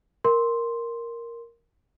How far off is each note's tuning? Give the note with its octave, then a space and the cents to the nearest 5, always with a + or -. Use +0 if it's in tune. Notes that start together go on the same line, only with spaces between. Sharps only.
A#4 +0 C6 +0